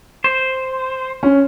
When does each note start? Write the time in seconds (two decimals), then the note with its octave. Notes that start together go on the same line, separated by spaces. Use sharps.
0.24 C5
1.23 C#4